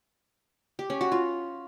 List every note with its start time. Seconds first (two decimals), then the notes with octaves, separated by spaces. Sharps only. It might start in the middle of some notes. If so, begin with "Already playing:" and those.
0.79 G4
0.90 C#4
1.01 F#4
1.12 F4